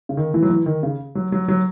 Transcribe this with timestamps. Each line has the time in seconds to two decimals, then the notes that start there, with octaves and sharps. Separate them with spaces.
0.09 C#3
0.17 D#3
0.34 E3
0.42 F#3
0.50 E3
0.66 D#3
0.83 C#3
1.15 F#3
1.32 F#3
1.48 F#3